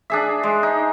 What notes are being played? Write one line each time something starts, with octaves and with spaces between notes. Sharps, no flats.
D4 G#4 E5
G#3
D#4